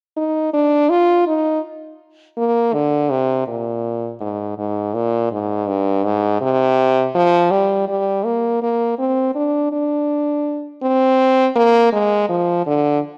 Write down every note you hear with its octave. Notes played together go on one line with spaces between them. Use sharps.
D#4
D4
F4
D#4
A#3
D3
C3
A#2
G#2
G#2
A#2
G#2
G2
G#2
C3
F3
G3
G3
A#3
A#3
C4
D4
D4
C4
A#3
G#3
F3
D3